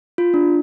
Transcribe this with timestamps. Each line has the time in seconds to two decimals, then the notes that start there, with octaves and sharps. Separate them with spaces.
0.18 F4
0.34 D4